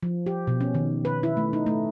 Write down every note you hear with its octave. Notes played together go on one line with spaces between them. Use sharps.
F3
G4
B2
C#4
D#3
B4
E4
A3
D#4
A3